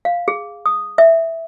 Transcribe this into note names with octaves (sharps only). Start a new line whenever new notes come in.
F5
G#4
D#6
E5